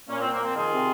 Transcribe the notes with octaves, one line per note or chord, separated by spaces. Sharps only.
A#2 A#3 C#4
A#2 C4
A#3
F3 C4
D#3 F4 G#4
C3